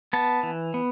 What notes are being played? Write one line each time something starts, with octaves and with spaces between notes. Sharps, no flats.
B3 A5
E3
B3